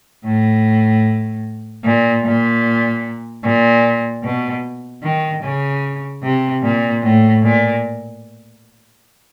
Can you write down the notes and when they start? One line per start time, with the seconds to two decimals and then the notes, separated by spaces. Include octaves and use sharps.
0.25 A2
1.84 A#2
2.24 A#2
3.43 A#2
4.23 B2
5.03 D#3
5.43 C#3
6.23 C3
6.63 A#2
7.03 A2
7.43 A#2